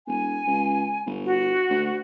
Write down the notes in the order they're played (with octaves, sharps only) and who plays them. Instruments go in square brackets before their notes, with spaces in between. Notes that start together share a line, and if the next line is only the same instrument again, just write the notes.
[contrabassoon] E1 [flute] G#5
[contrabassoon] C#2
G1
[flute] F#4
[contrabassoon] D2